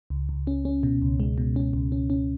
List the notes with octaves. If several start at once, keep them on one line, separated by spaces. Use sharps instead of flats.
C#2
C#2
C#4
C#4
B2
C#2
G#3
B2
C#4
C#2
C#4
C#4